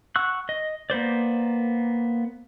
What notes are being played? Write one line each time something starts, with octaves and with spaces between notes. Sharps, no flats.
F#5 C#6 E6 F#6
D#5
A#3 B3 C5 D5